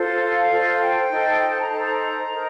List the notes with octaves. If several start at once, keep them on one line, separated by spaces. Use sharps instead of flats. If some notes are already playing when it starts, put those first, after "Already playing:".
Already playing: F4 A4 C5
F5
F4 A4 C5 D5
D#5
F5
G5
D#4 A4 C5
G5
A5
A#5
D#4 A4 C5 A5
A#5
D#4 A#4